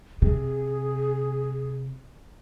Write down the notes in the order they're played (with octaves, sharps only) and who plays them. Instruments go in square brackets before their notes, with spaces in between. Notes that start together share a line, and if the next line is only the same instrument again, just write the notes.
[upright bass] C3 [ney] G#4